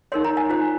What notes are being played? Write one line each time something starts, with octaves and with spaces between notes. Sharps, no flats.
D#4 A#4 C#5 C6
A#5
G#5
F4 C5